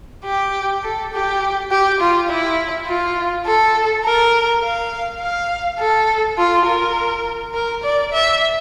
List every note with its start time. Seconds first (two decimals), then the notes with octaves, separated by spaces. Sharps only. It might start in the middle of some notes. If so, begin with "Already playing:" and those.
0.24 G4
0.83 A4
1.12 G4
1.71 G4
2.00 F4
2.29 E4
2.87 F4
3.46 A4
4.04 A#4
4.63 F5
5.20 F5
5.79 A4
6.38 F4
6.66 A#4
7.54 A#4
7.83 D5
8.12 E5